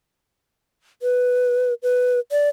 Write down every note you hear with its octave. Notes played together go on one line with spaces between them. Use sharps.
B4
B4
D5